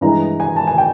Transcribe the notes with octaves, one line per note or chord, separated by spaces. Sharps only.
G2 E3 G#3 A#5
G#5
A5
G#5
G5